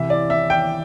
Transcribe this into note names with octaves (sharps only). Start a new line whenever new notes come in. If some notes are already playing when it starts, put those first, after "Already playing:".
Already playing: C2 C3 E3 E5
D5
E5
G5